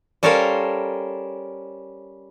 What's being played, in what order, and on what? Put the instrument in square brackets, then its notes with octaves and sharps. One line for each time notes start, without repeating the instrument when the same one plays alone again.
[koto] G3 C#4 A4 A#4 C5 F5